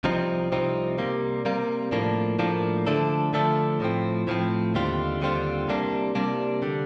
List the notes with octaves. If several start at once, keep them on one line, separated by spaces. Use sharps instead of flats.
C2 C3 F3 C4 D#4
C2 C3 F3 C4 D#4
C3 G3 A#3
C3 G3 A#3
A2 F3 A#3 D4
A2 F3 A#3 D4
D3 F3 A3 D4 A4
D3 F3 A3 D4 A4
A2 F3 C4
A2 F3 C4
D#2 D3 G3 C4 F4
D#2 D3 G3 C4 F4
C2 C3 G3 A#3 D4
C2 C3 G3 A#3 D4
D3 G3